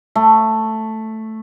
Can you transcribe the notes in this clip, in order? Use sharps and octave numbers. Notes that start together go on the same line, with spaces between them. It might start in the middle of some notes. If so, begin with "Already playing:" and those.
A3